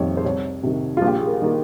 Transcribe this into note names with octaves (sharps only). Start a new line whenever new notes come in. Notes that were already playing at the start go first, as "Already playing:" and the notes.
Already playing: F1 F2 D#3 G3 A#3 C5 C#5
C5
C2 C#5
C3 D#3
A#1 F4
G4
G#4
A#4
D#3 A#3